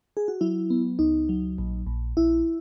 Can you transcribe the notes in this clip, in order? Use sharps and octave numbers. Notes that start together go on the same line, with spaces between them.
G#4
F#4
F#3 E4
B3
C#2 D#4
F#3
A#1
A#1
A#1 E4